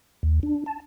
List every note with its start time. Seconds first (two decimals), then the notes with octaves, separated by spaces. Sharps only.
0.23 D#2
0.43 D4
0.66 A5